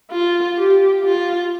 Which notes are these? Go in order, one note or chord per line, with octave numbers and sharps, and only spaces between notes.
F4
G4
F4